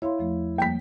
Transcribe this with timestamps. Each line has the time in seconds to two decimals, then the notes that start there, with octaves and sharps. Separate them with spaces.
0.02 E4 C#5 F5 C6
0.19 E2 F3 A3
0.58 F3 G3 A#3 G5 B6